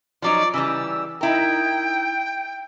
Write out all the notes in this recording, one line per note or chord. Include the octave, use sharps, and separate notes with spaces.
F3 F#3 D#4 D5
C#3 E3 G3 E6
D#4 E4 A#4 G5